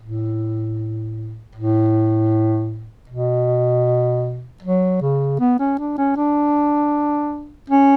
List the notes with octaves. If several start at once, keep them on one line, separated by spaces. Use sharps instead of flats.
A2
A2
B2
F#3
C#3
B3
C#4
D4
C#4
D4
C#4